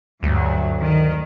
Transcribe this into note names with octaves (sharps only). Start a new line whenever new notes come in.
D2 G2 F#3
D#3